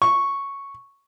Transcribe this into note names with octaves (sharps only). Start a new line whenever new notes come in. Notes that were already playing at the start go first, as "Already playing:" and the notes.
C#6